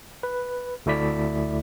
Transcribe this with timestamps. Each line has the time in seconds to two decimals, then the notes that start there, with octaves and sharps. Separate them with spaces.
0.23 B4
0.86 D2 A3 E4 D5 B6